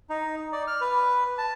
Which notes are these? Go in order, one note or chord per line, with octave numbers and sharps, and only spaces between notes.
D#4
D5
F6
B4
A5